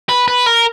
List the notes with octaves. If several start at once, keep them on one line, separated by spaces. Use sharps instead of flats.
B4
B4
A#4